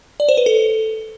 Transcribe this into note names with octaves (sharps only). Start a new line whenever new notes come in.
D5
C5
B4
A4